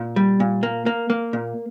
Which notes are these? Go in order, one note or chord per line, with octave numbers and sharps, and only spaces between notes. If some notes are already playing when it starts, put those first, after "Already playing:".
Already playing: A#2
G3
A#2
A#3
A#3
A#3
A#2